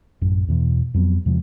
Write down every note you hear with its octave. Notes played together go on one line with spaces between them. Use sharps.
A1 F#2
E2 B2 E3
F2 F#3 B3
E2 C3 F3 G#3